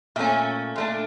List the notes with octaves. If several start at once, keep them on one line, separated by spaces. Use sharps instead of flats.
A#2 A3 C#4 E5
A#2 A3 D4